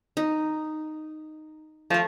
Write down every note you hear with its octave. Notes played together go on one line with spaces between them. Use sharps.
D#4
F3 A3 C5